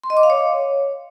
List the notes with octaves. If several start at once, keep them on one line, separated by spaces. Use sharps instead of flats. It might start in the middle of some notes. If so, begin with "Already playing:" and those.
C6
D#5
D6
F5
C#5